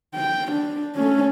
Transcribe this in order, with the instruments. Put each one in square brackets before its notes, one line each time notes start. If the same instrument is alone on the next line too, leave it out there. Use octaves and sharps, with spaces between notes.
[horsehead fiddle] G5
D4
A3 C#4